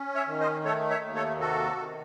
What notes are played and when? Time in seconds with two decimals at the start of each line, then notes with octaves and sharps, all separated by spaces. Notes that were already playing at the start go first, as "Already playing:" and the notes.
Already playing: C#4
0.15 C#5 E5
0.27 D#3
0.40 C5 D#5
0.65 A3 A4 C#5
0.90 C#5 E5
1.03 D#2
1.15 A4 C#5
1.40 C3 F#4 A4
1.78 D#3